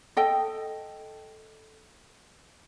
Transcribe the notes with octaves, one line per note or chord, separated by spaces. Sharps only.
A4 D#5 G5